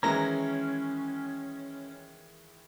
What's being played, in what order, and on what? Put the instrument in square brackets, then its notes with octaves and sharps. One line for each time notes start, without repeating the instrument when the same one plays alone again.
[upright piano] D#3 E3 G#3 [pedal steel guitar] C#4 [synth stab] A#5 A#6